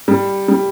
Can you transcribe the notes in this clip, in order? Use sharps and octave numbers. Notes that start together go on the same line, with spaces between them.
G3
G3